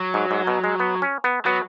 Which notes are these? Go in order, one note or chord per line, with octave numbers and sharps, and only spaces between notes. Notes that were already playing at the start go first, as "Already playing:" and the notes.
Already playing: F#3
G#2
G#2
B2
G#3
B3
C#4
B3
F#3 B3